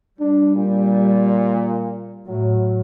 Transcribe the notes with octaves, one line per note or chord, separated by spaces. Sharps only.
G3 D4
A#2
A2 F#3